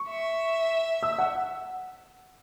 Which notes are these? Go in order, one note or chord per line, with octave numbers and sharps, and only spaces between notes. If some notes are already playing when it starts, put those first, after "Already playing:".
Already playing: C#6
E5
E6
F#5